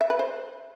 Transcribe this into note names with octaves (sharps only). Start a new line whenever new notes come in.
E5
B4
C5